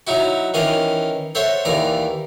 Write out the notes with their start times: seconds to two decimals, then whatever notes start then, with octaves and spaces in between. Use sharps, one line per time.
0.07 F#3 D#4 E4 F#4
0.54 D#3 E3 C#4 D#5 F5 D6
1.35 A4 C5 C#5 E5 F#5
1.65 D#2 E3 D5 A#5